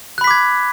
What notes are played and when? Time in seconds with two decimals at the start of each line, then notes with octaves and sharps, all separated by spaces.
0.18 F#6
0.21 B5
0.24 B6
0.27 D6
0.31 G#6